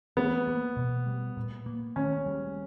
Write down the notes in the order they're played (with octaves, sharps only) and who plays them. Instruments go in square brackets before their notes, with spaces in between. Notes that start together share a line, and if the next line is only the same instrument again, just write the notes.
[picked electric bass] E3 [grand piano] B3
[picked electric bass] A#3
B2
G3
A#2
A#3
[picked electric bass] D#3 [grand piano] C#4
[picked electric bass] G3